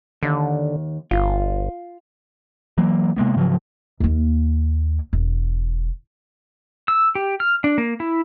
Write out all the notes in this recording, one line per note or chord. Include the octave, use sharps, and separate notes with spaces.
D#2 D3
G1 F4
E3 F#3 A#3
C3 G#3 A#3 B3
G#2 C#3 F3 F#3
D#2 A#3
E1
E6
G4
F6
D4
A#3
E4